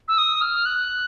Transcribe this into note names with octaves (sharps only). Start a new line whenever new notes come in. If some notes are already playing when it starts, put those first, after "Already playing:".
E6
D#6
F6
F#6